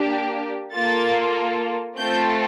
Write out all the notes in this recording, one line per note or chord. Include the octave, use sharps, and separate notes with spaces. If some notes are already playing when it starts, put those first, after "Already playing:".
Already playing: A#3 D4 G4
A#3 F4 A4 A6
A3 C4 F4 A4 G6